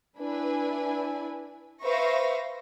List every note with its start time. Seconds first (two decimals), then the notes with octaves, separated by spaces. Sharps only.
0.18 D4 E4 B4 G#5
1.84 B4 C5 E5 F5 C#6 A#6